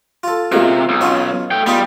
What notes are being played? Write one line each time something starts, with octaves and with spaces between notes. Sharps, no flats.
F4 A4
C3 G#3 F4 F#4 A#4
B1
C#4 F4 F5
A3 G5
G3 B3 D#4 F4 G#4